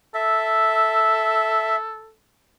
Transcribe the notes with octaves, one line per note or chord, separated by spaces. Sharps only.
A4 E5